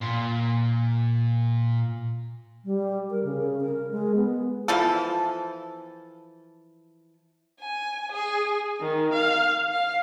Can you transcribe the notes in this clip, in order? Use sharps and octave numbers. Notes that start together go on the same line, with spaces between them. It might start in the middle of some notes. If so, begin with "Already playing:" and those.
A#2 C6
G3
A#4
C#3
A#4
G#3
B3
E3 F3 A4
G#5
G#4
D#3
F5
F5